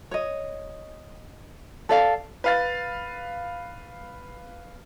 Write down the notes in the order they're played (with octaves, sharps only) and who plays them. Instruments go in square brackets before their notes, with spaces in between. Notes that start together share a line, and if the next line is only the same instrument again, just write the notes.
[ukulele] C#5 D#5
A4 D5 F5
[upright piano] B4 F5 A6